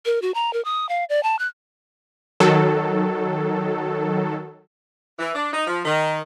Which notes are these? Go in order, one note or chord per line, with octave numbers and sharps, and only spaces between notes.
A#4
F#4
A#5
A#4
D#6
F5
D5
A5
F#6
D#3 F#3 A4
E3
D4
D#4
F3
D#3